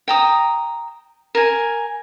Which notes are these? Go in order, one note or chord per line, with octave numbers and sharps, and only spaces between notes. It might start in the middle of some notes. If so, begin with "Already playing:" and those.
G5 A#5 D#6
A#4 G#5